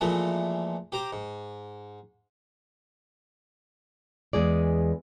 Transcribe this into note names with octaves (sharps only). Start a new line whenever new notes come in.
A#2 E3 F3 G#3 A3
G4 C5 A#5 D6
G#2
E2 G#3 G#4 D5